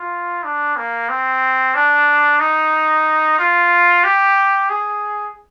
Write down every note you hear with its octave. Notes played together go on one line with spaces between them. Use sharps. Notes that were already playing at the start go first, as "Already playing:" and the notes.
Already playing: F4
D4
A#3
C4
D4
D#4
F4
G4
G#4